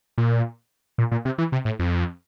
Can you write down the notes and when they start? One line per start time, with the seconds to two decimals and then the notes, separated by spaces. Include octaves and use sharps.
0.18 A#2
0.98 A#2
1.12 A#2
1.25 C3
1.38 E3
1.52 C3
1.65 A2
1.79 F2